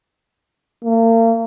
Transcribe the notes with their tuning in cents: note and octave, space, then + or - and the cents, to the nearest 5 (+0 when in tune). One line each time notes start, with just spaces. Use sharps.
A#3 -40